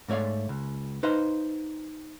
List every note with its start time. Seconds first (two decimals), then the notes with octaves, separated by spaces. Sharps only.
0.08 G#2 A3 C#5 D5 F5
0.49 C#2
1.03 D#4 B4 C5 D#5 F5